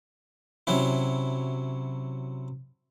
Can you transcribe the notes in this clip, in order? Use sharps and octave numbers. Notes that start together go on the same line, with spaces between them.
C3 F#3 C#4 E4